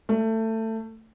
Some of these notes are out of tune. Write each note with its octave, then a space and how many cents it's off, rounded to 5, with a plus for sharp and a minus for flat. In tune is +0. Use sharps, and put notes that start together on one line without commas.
A3 +20